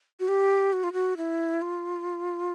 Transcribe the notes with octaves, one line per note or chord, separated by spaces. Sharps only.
F#4
G4
F#4
F4
F#4
E4
F4